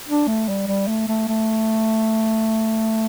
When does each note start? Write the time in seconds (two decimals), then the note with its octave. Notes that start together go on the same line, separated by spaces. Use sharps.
0.08 D4
0.27 A3
0.48 G3
0.67 G3
0.88 A3
1.08 A3
1.28 A3